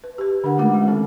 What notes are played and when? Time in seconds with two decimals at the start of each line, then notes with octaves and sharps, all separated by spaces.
0.04 B4
0.18 G4 B4
0.44 D3 D4 A#4 F#5
0.58 G#3 A3 C#4 F4 F#5
0.74 G#3
0.88 D#3 C4 F4 A4